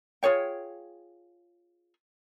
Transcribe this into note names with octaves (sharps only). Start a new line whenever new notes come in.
F4 G#4 C#5 G5